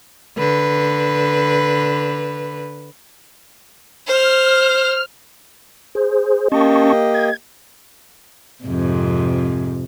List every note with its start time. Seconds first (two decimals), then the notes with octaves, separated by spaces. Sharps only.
0.38 D3 B4
4.07 C5 F6
5.95 G#4 C5
6.52 A#3 C#4 G4 D#5 A5 C#6
7.14 G#6
8.64 F2 G#2 C3